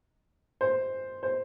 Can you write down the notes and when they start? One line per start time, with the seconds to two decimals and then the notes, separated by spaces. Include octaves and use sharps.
0.61 C5
1.23 C5